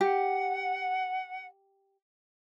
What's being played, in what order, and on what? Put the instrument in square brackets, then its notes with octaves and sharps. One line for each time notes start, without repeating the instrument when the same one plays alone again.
[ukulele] G4 [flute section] F#5